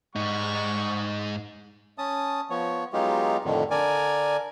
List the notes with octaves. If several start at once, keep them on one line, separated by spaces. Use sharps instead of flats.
G#2 G3 D#4 F#5 C#6
C#4 A5 D#6
F3 B3 C#5
F#3 G#3 B3 D#4 F4 G4
F2 A2 D3 D#3
D3 A#4 D5 G#5